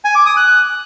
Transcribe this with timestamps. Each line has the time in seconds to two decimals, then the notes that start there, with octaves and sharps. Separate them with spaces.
0.05 G#5
0.15 D6
0.26 D#6
0.37 F#6